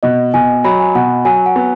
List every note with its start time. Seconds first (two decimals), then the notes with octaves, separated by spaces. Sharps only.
0.03 B2 D#5
0.34 B2 G#5
0.64 F#3 B5
0.80 G#5
0.95 B2 F#5
1.25 F#3 G#5
1.46 F#5
1.56 B3